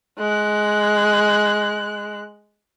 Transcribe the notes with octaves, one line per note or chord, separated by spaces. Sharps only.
G#3 F#6